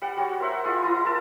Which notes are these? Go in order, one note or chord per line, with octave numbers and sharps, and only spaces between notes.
G3 F#5
G3 F#4 C#5
A#4 C5 E5 F#5
G#3 E4 F4
E4 F#5 A#5
A#4 A5